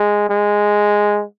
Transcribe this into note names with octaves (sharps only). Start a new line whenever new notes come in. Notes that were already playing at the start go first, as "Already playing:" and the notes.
Already playing: G#3
G#3